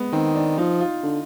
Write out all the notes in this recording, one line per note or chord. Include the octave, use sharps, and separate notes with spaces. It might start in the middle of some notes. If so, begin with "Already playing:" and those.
Already playing: G#3 B3
D#3 C4
D4
F3 D#4
F4
D3